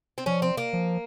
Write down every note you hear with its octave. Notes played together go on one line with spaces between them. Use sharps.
C4
F3 C#4
C4
A#3
F3